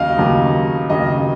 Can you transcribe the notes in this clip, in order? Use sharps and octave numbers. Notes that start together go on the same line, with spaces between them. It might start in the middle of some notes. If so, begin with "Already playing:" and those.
Already playing: D#2 C#3 F#3 D#5 F5
D#2 C#3 F#3
D#2 C#3 F#3 D#5